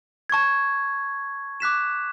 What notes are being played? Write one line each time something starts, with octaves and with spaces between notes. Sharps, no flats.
A5 C#6 G#6
D6 F#6 B6 E7